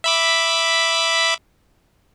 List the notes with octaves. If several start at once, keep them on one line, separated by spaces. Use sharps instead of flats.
E5 B5 D6